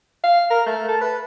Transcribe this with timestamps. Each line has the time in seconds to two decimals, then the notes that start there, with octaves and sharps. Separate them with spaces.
0.24 F5
0.51 A#4
0.66 A3
0.88 A4
1.01 B4